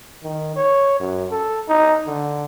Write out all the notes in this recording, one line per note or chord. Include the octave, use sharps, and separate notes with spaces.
D#3
C#5
F#2
A4
D#4
D3